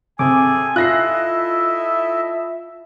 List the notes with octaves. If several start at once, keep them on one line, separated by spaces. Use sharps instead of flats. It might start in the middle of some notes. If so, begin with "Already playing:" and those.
C3 C4 G#4 A4 G#5 D6
E4 F4 A4 D#5 E5 F#6 A#6 C7